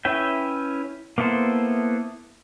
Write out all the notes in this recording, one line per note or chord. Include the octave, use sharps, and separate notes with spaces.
C#4 E4 B4 E5 G5
A#3 B3 E4 A4 C5